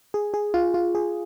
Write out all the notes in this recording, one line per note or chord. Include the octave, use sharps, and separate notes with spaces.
G#4
G#4
F4
F4
G#4